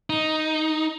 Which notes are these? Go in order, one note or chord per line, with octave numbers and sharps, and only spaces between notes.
D#4